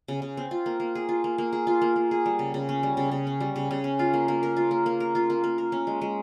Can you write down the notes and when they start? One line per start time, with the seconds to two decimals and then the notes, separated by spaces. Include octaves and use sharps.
0.08 C#3
0.22 C#3
0.37 C4
0.51 F4
0.66 A#3
0.80 A#3
0.95 G#4
1.09 F4
1.24 A#3
1.38 A#3
1.53 G#4
1.67 F4
1.81 A#3
1.96 A#3
2.11 G#4
2.26 G3
2.39 C#3
2.54 C#3
2.69 C#4
2.83 G3
2.97 C#3
3.11 C#3
3.27 C#4
3.40 G3
3.56 C#3
3.71 C#3
3.84 C#4
3.99 F4
4.13 A#3
4.28 A#3
4.43 A#4
4.57 F4
4.71 A#3
4.86 A#3
5.00 A#4
5.15 F4
5.30 A#3
5.44 A#3
5.58 A#4
5.72 C#4
5.87 G#3
6.01 G#3